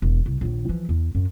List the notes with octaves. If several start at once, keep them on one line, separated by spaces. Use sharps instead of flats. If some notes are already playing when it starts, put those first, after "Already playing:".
E1
C2
A#1 D#2
E3 F3
E2
F#2